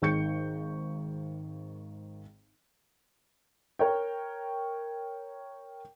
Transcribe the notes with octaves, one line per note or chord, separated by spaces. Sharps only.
G#1 D#3 C#6 G6 C#7
A#4 C#5 G5